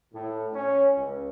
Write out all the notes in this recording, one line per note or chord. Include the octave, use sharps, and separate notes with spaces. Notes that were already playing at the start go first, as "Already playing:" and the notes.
A2
C#4
C#2